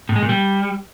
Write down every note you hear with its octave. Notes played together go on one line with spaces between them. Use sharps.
A2
G#3
A#2
G3